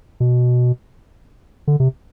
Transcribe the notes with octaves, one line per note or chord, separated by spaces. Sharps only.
B2
D3
C3